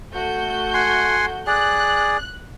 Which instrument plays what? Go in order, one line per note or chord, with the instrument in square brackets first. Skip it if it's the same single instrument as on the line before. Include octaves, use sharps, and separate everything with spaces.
[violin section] A3 F#4 G6
[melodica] F#5 G#5 C6
[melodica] G#4 D5 [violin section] F#6